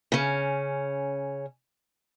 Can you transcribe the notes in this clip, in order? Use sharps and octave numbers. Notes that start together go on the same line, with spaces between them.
C#3 C#4